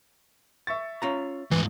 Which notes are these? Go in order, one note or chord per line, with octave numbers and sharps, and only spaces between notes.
E5 C#6 A6
C#4 F4 A#5
D2 G#2 E3